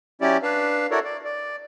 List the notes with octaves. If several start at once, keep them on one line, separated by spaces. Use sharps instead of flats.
F#3 C#4 E4 G4 D5
D4 B4 F5
E4 F#4 A4 A#4 C#5 D5
D5
D5